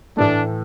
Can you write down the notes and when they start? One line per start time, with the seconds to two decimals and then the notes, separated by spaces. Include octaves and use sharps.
0.17 A2 E3 A3 D4